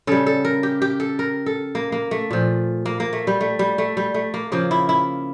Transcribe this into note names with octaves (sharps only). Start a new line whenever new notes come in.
C#3 G3 A4
A4
A#4
G4
G4
A4
A#4
A4
A#3
A#3
A3
A#2 F3
A#3
A#3
A3
G3
A3
G3
A3
G3
A3
A#3
C#3 F3 A#3
E4
E4